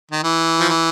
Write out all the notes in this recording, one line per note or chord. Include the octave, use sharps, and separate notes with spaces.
D#3
E3
F3
E3